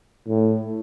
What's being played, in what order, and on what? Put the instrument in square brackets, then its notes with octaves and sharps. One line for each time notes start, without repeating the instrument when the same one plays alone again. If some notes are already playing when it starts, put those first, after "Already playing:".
[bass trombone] A2